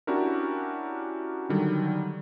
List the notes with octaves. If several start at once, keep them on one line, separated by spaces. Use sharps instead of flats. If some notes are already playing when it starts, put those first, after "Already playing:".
C#4 D4 E4 F#4 G4 A#4
D3 D#3 F#3 G3